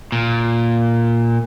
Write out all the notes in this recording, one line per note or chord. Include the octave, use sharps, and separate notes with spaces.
A#2